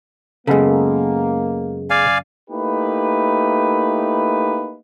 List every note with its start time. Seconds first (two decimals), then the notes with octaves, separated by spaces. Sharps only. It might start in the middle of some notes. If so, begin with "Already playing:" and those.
0.47 F#2 C#3 G#3 A#3 B3 A4
1.90 D5 F5 G#5
2.50 A3 A#3 D#4 E4 G4 B4